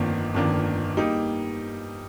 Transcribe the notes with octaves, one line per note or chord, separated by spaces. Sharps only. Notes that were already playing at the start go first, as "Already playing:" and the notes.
Already playing: G1 F2 D#3 A#3 D4
G1 F2 D#3 A#3 D4
G3 A#3 D#4